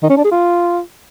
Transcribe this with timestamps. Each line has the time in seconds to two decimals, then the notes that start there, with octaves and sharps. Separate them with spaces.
0.02 D#3
0.10 C#4
0.17 D4
0.24 G#4
0.31 F4